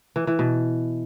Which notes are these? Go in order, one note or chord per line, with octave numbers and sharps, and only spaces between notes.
E3
E3
B2